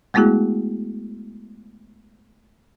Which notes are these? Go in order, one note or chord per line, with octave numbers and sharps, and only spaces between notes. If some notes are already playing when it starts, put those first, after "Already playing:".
G#3 A3 B3 E4 F#4 G#4